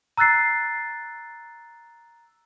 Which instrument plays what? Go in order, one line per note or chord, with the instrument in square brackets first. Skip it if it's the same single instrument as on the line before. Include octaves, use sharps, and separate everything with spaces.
[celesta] A#5 E6 F#6 A6 C7